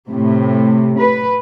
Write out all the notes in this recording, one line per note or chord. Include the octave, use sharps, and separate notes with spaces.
A2 C3
B4